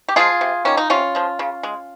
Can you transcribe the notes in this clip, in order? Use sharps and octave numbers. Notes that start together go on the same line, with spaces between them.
G4
F3 G#3 F4 G#4
C3
D#3 A#3 C#4
D#4
C3 C#4 F4
F3 G#3
C#3
G#3